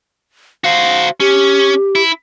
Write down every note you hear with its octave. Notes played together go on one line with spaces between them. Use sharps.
F#4 C5 F5
C#4 G4
E4